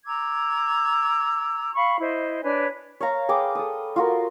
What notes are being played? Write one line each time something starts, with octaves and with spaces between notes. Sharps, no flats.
A#5 D6 E6 G#6
F5 B5 C#6
E4 C5 D#5
D4 B4 C#5 G#5
C#5 F5 A#5
G#4 B4 G5 D6
A4 D#6
F4 F#4 A#4